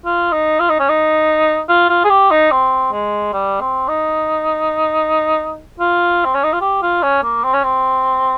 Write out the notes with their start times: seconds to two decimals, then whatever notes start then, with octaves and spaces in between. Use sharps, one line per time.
0.05 F4
0.32 D#4
0.60 F4
0.70 D#4
0.80 C#4
0.89 D#4
1.69 F4
1.90 F4
2.05 G#4
2.10 G4
2.31 D#4
2.51 C4
2.92 G#3
3.33 G3
3.60 C4
3.88 D#4
5.80 F4
6.25 C4
6.35 C#4
6.44 D#4
6.53 F4
6.61 G4
6.82 F4
7.03 C#4
7.23 A#3
7.44 C4
7.54 C#4
7.64 C4